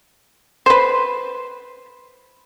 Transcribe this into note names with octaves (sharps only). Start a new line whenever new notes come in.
B4 C5